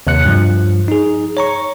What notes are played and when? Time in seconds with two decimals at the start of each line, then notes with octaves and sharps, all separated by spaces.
0.07 D#2 C3 F#6 C#7
0.25 G2 F3
0.88 D#4 G#4
1.37 C#5 A#5 C#6